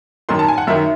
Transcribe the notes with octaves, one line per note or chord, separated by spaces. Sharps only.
F#2 D#3 C6
A5
G#5
F#5
F#2 D#3 E5